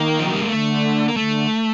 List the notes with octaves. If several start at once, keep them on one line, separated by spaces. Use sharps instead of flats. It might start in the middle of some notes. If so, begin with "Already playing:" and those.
Already playing: D#3 A#3
F3
F#3
G3
G#3
D3 A3
A#3
D3 A3